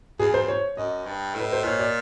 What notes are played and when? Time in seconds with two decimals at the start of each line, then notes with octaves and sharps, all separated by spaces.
0.19 E2 G#4
0.34 C5
0.48 C#5
0.77 F#2 D#5
1.06 G2
1.35 A2 B4
1.53 C5
1.64 A#2 C#5
1.80 D5